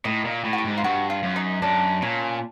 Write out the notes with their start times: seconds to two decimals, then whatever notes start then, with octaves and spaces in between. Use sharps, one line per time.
0.05 A2 D#4
0.25 A#2
0.44 A2
0.53 F#4
0.58 G4
0.65 G#2
0.78 F4
0.84 G2 F#4
1.10 F4
1.23 F#2
1.36 D#4
1.62 F#2 D4
2.02 A#2 C#4